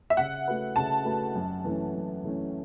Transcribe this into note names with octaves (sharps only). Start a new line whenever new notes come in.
E5
C#3 F#5
A3 F#4 B4
C#3 A5
A3 F#4 B4
F#2
E3 A3 C#4
F#2
E3 A3 C#4